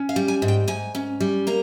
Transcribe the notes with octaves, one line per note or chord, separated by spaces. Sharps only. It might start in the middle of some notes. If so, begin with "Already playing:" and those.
Already playing: C#4
F5
G3
G#5
G#2
G5
G#2 G#5
C#4
G3
A#3 A#5